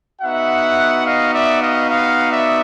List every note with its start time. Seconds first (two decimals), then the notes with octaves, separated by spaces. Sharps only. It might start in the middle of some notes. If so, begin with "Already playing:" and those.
0.21 B3 D#4 F#4 E5 F#5
1.05 D#5 F5
1.33 D5 E5
1.62 D#5 F5
1.89 D#5 F5
2.31 D5 E5